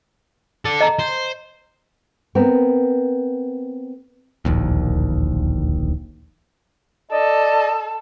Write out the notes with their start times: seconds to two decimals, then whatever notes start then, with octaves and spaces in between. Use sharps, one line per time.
0.65 A4 D5
0.81 D#5 A#5
0.99 C5
2.35 B3 C4 A#4
4.45 D1 A#1 D#2
7.12 A4 D5 D#5